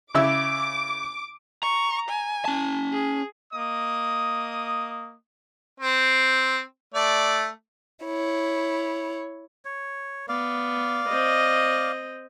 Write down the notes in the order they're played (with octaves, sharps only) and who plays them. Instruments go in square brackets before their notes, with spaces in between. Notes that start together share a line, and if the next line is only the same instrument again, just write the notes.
[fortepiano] C#3 E4 E6 [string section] D6
[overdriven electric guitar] A#5 [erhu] C#6
[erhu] G#5
[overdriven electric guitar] C#4 A5
[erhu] G#4
[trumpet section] A#3 D#5 D#6
[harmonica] C4
A3 D5
[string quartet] E4 C#5
[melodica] C#5
[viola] B3 [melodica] D5 F5
[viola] C4 D#5